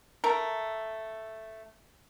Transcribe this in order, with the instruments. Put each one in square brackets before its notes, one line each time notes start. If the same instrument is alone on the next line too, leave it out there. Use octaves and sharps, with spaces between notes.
[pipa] A3 A#4